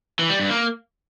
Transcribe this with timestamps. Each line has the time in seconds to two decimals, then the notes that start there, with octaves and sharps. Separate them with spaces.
0.19 E3
0.29 G3
0.40 G2
0.50 A#3